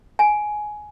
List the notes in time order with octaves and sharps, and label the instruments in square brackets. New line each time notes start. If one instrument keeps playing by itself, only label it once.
[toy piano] G#5